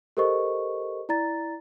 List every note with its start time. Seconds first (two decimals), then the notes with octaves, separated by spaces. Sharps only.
0.17 G4 A4 A#4 C5 D#5 C#6
1.09 E4 D5 A#5 A6